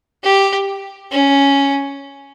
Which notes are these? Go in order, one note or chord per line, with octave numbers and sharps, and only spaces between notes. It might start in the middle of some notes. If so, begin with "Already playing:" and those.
G4
C#4